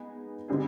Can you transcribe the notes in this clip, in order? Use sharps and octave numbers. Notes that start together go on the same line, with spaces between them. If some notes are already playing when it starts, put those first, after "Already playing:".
Already playing: G#3 B3 D#4 G#4
D3 G3 C4 D#4 G#4